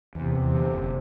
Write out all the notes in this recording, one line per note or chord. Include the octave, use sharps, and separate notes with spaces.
E2 C3
E2
D3
F#1